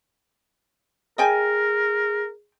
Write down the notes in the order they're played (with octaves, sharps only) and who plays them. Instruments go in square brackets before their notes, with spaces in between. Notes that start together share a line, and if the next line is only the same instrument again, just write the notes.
[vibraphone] G#4 [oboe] A#4 [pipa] D#5 G5 G#5